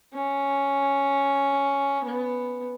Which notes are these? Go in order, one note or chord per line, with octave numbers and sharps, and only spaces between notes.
C#4
B3